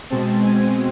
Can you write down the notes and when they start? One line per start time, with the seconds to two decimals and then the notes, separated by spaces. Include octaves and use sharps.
0.10 B2 G#3 C4 A5
0.43 G#5